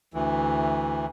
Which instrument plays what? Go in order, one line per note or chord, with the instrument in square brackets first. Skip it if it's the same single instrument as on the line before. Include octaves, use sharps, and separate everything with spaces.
[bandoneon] D2 E3